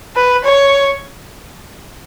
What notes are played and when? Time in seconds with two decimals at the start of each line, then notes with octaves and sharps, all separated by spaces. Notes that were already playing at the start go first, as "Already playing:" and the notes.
0.16 B4
0.45 C#5